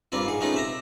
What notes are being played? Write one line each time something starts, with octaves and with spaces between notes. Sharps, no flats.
G2 G3 A#3 C4 F4
G#2 G#4
G#3 A3 B3 C#4 D#4 F4
C3 E5 A#5